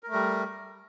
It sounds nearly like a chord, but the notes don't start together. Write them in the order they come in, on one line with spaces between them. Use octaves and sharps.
A#4 A3 G3